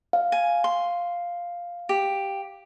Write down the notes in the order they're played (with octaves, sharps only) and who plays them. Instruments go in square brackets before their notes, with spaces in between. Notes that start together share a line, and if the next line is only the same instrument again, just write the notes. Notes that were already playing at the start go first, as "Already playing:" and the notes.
[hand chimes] F5
[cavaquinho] G#5
C6
G4